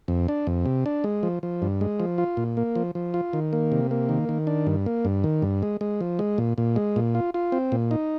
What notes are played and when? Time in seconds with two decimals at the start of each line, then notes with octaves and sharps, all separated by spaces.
0.08 F2
0.28 D4
0.47 F2
0.66 C3
0.86 D4
1.04 G#3
1.23 F3
1.43 F3
1.62 G2
1.81 G#3
2.00 F3
2.18 F4
2.37 A#2
2.57 A#3
2.76 F3
2.95 F3
3.14 F4
3.33 D#3
3.53 A#3
3.72 C3
3.91 A#3
4.09 D#3
4.29 D#3
4.47 D4
4.67 G2
4.86 A#3
5.05 G2
5.24 D#3
5.42 G2
5.63 G#3
5.81 G#3
6.01 F3
6.19 G#3
6.38 A#2
6.58 A#2
6.76 G#3
6.96 A#2
7.15 F4
7.34 F4
7.52 C4
7.72 A#2
7.91 D#4